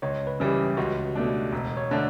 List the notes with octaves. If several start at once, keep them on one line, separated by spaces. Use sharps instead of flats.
C#2 C#5
B4
C#3 E3 G3
G4
C#2 F#4
B2 A3 D4
E1
C#5
D3 A3 D4